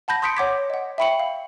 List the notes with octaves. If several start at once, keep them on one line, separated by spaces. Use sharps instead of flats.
F#5 A5 B5 G6 A#6
C6 D#6 G6 B6 C#7 D7
C#5 F#5 C6 D6 G#6 B6
D#5 F#5
E5 G5 B5 C#6 C#7 F#7
F5